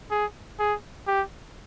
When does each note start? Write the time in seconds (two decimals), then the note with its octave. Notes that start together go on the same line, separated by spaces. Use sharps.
0.11 G#4
0.59 G#4
1.07 G4